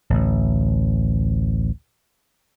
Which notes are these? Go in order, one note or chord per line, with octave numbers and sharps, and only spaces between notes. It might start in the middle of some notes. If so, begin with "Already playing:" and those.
A1 D2